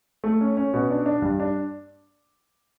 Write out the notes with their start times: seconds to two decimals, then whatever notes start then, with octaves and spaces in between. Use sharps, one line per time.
0.24 A3
0.41 C#4
0.57 C#4
0.73 B2
0.90 D4
1.06 D4
1.22 G2
1.40 D4